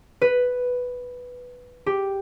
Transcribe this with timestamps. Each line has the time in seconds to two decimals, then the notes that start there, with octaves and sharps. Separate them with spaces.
0.21 B4
1.86 G4